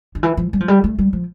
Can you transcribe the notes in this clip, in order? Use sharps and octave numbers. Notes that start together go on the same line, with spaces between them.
D3
E3
F3
G3
F3
G3
A3
G3
F3